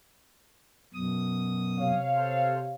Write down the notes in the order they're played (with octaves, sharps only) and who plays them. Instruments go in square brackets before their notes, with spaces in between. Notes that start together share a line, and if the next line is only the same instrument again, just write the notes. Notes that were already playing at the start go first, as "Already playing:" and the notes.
[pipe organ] F#2 B2 D#6
[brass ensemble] C3 C#5 F5
[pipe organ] A4 C5